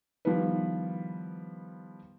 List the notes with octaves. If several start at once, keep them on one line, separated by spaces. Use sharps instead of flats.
D#3 F3 G3 B3 E4 B4